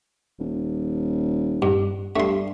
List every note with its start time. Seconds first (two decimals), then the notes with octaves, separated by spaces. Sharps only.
0.39 D#1
1.62 G2
2.16 G2 A3 C6